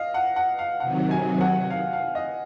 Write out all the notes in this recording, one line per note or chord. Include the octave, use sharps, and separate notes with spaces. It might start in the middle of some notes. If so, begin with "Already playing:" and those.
Already playing: D#5 F5
F#5
F#5
F5
C3 D#3 F#3 F#5
G#5
F#5
F5
F5
D#5